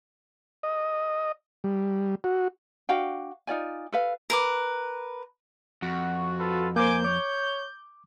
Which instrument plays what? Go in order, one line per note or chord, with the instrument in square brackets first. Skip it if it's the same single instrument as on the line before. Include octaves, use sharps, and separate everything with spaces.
[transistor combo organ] D#5
G3
F#4
[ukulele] D4 F#4 F5 G5
D#4 F4 D5 G#5
A4 B4 F5
[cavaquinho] A#4 B4 D6
[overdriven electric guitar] F2 [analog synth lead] F#4
[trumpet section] F4 A4 B4
[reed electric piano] A#3 C5 [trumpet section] G#5 D6 [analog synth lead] G6
[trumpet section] C#5 [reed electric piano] D6